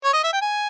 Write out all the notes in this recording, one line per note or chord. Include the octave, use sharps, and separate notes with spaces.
C#5
D#5
E5
G5
G#5